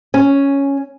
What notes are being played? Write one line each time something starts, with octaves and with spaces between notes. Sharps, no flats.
C#4